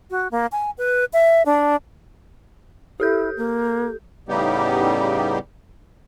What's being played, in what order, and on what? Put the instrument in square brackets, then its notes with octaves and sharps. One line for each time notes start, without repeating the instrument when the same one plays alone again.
[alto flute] F#4
A#3
G#5
B4
E5
D4
[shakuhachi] E4 [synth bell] G4 A4 G6
[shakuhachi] A#3
[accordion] A2 C#3 G3 B3 D#4 G4